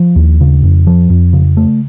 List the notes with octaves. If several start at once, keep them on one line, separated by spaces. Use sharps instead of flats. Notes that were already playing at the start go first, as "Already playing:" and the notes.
Already playing: F3
D#2
C#3
F2
F3
F2
C#3
A3